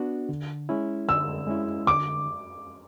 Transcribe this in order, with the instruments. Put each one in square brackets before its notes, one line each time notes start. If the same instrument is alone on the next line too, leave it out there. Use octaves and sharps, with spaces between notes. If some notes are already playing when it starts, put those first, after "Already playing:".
Already playing: [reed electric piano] B3 D4 F#4
D3
G#3 C#4 E4
[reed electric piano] D3 [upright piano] E6
[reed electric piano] G#3 C#4 E4
[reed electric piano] D3 [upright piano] D6